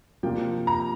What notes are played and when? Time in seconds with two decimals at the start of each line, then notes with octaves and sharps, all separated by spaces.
0.23 C3 F3 A#3 D4 G5
0.67 A#5